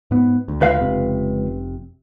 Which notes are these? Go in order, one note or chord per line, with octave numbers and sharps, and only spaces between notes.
G#2 B3
D2
C#2 B4 F5
F1 C3